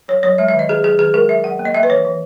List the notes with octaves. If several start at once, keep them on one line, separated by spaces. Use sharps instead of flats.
F#3 C#5
F#3 C#5
G#3 E5
E5
D#3
D#5
D#3 G#4
F#3 G#4
D#3 G#4
G#3 A#4
F#3 E5
F#3 F#5
A#3
D#5
A#3 E5
B4
E3 C#5
E3